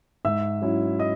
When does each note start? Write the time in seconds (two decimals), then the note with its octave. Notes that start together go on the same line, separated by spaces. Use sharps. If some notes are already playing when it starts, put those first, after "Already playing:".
0.25 G#2 E5 E6
0.62 F#3 C#4 E4
0.99 D#5 D#6